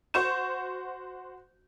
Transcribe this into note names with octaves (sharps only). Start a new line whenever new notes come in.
F#4 C5 C#6 G6 E7